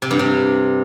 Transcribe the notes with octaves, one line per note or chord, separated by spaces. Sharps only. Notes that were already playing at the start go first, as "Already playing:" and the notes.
C3
G2
C3